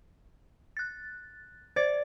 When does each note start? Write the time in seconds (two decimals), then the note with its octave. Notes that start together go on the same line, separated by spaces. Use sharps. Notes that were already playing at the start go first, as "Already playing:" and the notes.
0.77 F#6 A6
1.76 C5 D5 A6